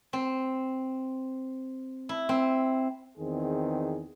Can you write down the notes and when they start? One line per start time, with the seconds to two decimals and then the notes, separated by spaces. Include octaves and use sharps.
0.13 C4
2.09 E4
2.29 C4
3.18 E2 D#3 C4 G#4